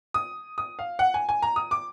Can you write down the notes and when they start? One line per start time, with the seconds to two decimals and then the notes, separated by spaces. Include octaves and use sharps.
0.14 D#6
0.58 D#6
0.79 F5
0.99 F#5
1.14 G#5
1.29 G#5
1.42 A#5
1.56 D#6
1.71 D6